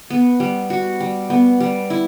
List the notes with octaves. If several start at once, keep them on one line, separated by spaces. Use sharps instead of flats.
B3
G3
F#4
G3
B3
G3
E4